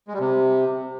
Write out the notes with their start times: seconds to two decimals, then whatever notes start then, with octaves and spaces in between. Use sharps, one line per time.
0.08 G#3
0.14 G3
0.19 C3